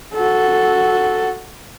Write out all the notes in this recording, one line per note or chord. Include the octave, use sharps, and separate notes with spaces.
F#4 A4